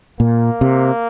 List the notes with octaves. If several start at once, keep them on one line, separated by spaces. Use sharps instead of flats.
A#2 A#3
C3